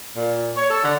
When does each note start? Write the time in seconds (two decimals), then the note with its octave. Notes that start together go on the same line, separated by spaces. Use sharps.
0.16 A#2
0.56 C#5
0.70 A4
0.82 D3